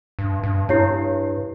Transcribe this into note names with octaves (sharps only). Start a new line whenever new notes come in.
G2
G2
G2 E4 G4 C#5